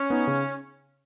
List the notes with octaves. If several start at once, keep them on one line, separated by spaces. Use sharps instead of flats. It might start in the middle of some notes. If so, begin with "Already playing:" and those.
Already playing: C#4
B3 D#4
C#3